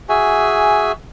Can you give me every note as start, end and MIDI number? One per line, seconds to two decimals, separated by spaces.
0.09 0.92 66
0.09 0.92 68
0.09 0.92 76
0.09 0.92 80